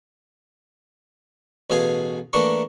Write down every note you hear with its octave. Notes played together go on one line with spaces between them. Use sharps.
A1 B2 G#4 F5 G#5
E3 A3 A#3 D4 A#4 C#6